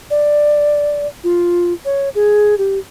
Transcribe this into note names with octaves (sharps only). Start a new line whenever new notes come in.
D5
F4
C#5
G#4
G4